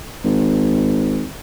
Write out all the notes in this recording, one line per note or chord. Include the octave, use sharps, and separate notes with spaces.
G#1